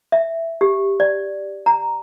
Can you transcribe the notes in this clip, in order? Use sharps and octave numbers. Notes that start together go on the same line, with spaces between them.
E5
G4
D5
A#5